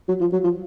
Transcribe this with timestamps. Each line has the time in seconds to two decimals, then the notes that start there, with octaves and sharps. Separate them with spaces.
0.09 F#3
0.21 F3
0.33 F#3
0.44 F3